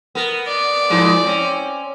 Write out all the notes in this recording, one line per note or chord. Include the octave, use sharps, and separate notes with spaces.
B3 A#4
D5
G#2 F3 G#3
C4 C#4